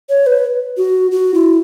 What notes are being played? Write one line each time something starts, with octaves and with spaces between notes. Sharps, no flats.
C#5
B4
F#4
F#4
E4